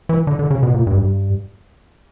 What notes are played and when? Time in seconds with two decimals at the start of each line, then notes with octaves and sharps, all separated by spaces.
0.09 E3
0.27 D3
0.39 D3
0.50 C#3
0.63 B2
0.74 A#2
0.87 G2
0.98 G2